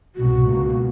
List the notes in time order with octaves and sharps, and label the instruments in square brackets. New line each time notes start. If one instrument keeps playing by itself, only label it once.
[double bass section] C2 G#2 B2 [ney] F#4
[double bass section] C#2 B2 A#3